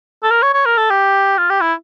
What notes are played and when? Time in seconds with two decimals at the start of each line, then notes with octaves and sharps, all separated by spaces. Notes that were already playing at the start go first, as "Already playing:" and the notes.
0.23 A4
0.31 A#4
0.42 C#5
0.54 C#5
0.65 A#4
0.77 A4
0.90 G4
1.38 F4
1.50 G4
1.61 E4